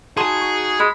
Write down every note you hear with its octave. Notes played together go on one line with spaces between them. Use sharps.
D#4 F#4 G#4 G#5 A5 C6 D#6
C#6
G#3 B5